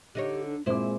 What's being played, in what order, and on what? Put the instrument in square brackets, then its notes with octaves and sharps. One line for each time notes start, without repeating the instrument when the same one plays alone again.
[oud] D3 D#4 C#5 [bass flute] G4
[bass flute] D4
[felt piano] A#2 C4 D6 [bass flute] G#3 [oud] E4 C5